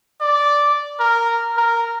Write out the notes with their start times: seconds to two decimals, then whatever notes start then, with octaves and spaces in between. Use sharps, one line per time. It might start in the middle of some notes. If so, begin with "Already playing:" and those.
0.21 D5
1.00 A#4
1.57 A#4